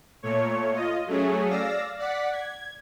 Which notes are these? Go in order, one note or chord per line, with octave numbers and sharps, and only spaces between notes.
A#2 A3 C#5
F4 D#5
F#3 A3 C#4 G#4
D5 F5 E6 A#6
D5 F#5 B6
G#6